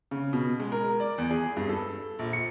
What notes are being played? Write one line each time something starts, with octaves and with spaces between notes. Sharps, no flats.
C#3
B2
G#3
A#4
D5
E2
G#4
G2
A4
A#1
C#7